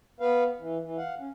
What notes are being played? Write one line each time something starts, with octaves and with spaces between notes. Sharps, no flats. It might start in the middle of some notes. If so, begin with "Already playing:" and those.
B3 B4 F5
E3
E3
F5 F#5
C#4